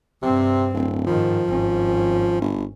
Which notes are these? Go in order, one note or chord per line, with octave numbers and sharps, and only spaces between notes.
G2 C3 C4
D1
G#2 D#3 F3
G#1 C#4
G1